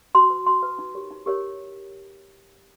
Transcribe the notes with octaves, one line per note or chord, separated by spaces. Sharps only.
F#4 C6
B4
F#4 C6
B4
D#4
G4 A#4 C#5
D#4
G4 A#4 C#5